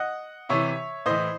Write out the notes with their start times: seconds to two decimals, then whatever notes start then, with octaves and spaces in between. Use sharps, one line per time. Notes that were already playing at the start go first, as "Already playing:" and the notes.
Already playing: D#5 F#5
0.49 C3 E3 C#5 E5
1.06 A2 E3 C5 D#5